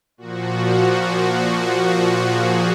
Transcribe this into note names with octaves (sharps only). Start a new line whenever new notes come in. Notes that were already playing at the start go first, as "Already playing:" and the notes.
A#2 F3 F#4
G#4